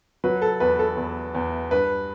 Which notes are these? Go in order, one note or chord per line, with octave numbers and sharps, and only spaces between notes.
F#3 B4
A4
E2 B4
A4
E2
E2
G2 B4